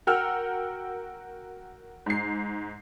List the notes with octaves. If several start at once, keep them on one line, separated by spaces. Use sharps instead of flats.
F#4 A#4 F#5 G5 E6 F6
G#2 C7